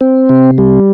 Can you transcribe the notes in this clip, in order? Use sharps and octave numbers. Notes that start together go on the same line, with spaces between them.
C4
C3
G3